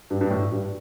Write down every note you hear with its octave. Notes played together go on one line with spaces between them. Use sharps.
G2
G2
A2
G2